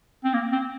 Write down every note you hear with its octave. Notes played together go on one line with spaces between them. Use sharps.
C4
A#3
C4